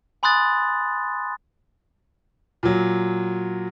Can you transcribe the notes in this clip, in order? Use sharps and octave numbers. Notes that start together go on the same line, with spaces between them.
G#5 B5 C6 D#6 F#6 A6
A#2 F#3